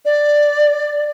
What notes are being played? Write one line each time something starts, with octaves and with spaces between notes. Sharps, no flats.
D5